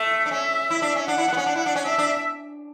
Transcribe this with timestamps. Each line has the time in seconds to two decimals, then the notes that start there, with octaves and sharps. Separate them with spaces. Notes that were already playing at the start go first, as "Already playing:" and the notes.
Already playing: A3 E5
0.26 D4
0.31 C#4 E5
0.70 E4
0.82 D4
0.95 C#4
1.08 D4 F#5
1.18 E4
1.28 D4
1.33 B3
1.37 C#4
1.46 D4
1.56 E4
1.66 D4
1.75 C#4
1.85 D4 E5
1.98 D4